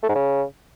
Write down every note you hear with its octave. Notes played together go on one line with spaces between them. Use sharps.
A3
G#2
C#3